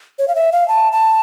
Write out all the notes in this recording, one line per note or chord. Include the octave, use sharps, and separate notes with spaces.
C#5
F5
E5
F5
A5
A5